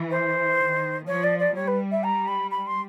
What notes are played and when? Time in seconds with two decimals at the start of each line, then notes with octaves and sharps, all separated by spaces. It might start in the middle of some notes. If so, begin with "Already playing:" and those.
Already playing: E3
0.11 C5
0.59 D#3
1.07 F3 C#5
1.23 D5
1.39 D5
1.55 G3 C#5
1.68 B4
1.91 E5
2.04 A#5
2.28 B5
2.51 B5
2.67 C6